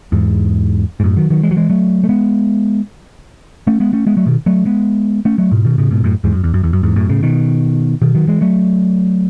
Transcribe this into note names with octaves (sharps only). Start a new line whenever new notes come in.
E2 G#2
G#2
F#2 A2
D#3 F#3
D#3 F#3
E3 G#3
F#3
E3 G#3
F#3 A3
A3
G#3 B3
A3 C#4
G#3 B3
A3 C#4
G#3 B3
F#3 A3
B2 D#3
F#3 A3
G#3 B3
A3 C#4
F#3 A3
G#2 B2
B2 D#3
A2 C#3
G#2 B2
F#2 A2
E2 G#2
F#2
E2
F#2
E2
F#2
E2 G#2
F#2 A2
A2 C#3
B2 D#3
B2 D#3
D#3 F#3
E3 G#3
F#3 A3